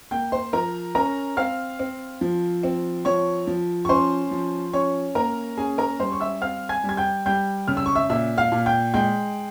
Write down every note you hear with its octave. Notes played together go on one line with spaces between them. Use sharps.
A#3 G5 G6
C5 C6
F3 A#4 A#5
C#4 A#4 A#5
C4 F5 F6
C4
F3
C4
F3 C#5 C#6
F3
C#6
C#4 C5 C6
F3
C#4 C#5 C#6
A#3 A#4 A#5
C#4 G#4 G#5
A#4 A#5
G3 C5 C6
C#6
E5 E6
C4 F5 F6
G#5 G#6
G3
G#6
G5 G6
G3 G5 G6
C#3 F6
E6
C#6
E5 E6
A#2 E5 E6
F5 F6
A#2
G5 G6
G#3 G5 G6